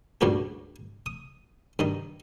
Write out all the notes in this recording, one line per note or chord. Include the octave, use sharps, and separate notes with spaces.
C#2 G2 A#2 D4 F#4 G4
D#6
G2 D#3 D#6